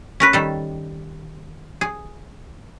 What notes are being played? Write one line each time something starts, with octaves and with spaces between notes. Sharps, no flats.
C#4 A#4 B4
D#3 G3 A4
G#4